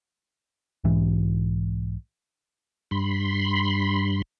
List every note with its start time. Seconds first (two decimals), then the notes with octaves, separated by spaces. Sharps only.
0.84 B1 G#2 E3
2.91 G2 B5 C6